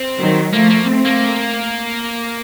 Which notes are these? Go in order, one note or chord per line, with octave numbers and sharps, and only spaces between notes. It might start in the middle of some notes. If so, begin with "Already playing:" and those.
Already playing: C4
D#3 F#3
F3 A3 A#3
A#3
A3 C4
A#3